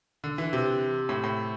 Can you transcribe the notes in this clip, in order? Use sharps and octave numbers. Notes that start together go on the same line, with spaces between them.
D3
E3
C3
A2
A2